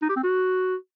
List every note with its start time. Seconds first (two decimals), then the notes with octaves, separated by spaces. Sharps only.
0.02 D#4
0.09 G4
0.16 C4
0.23 F#4